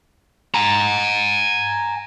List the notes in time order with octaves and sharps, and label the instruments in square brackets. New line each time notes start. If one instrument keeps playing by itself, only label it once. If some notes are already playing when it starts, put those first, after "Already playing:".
[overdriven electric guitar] G#5 A#5